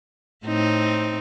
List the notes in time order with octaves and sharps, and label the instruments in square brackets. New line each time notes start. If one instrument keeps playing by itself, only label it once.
[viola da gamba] A2 C4 D#4